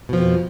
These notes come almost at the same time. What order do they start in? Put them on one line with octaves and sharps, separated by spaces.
B2 F3 F2